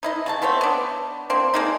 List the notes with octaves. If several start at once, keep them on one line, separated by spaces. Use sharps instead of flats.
D#4 E4 D#5
C#3 A3 A5
A3 B3 C4 C#5
B3 D4
A#3 C4 D4
G#3 A#3 D#4